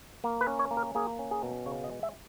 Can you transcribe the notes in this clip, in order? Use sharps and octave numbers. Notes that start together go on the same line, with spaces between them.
A#3
B4
C#4
C#5
A#3
A#4
A#3 G#4
C#4
G#4
B2
C#3 C#5
D#5
G#3
E5